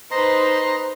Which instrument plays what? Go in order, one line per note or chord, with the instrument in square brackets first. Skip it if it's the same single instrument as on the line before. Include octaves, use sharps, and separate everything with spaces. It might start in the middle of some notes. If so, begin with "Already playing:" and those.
[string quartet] D#4 B4 C5 [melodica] D#5 A#5 C6